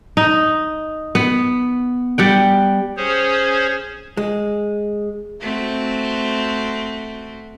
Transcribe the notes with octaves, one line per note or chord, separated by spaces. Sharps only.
D#4
B3
G3 F#5 G5
C#4 G#4 C5 C#5
G#3
A3 C4 F#4